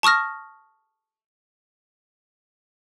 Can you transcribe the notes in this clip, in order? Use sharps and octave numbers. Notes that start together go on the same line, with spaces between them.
A5 C#6 D#6 F6 A#6